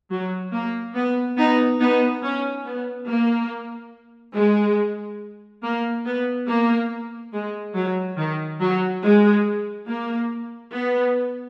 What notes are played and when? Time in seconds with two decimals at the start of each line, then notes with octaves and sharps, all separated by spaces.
0.11 F#3
0.53 A#3
0.95 B3
1.37 B3 D#4
1.80 B3 D#4
2.23 C#4
2.66 B3
3.08 A#3
4.35 G#3
5.63 A#3
6.05 B3
6.48 A#3
7.33 G#3
7.75 F#3
8.17 D#3
8.61 F#3
9.03 G#3
9.88 A#3
10.73 B3